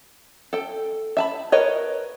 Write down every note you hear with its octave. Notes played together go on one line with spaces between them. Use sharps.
A4 G5
E5 A5 B5
A#4 B4 C#5 D#5